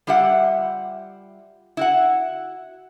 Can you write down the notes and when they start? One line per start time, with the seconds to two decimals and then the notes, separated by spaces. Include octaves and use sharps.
0.07 G3 F4 G4 E5 F#5
1.77 E4 F#4 F#5